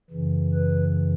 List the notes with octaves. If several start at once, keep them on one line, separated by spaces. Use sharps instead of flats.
F#2 C#3 E3
B4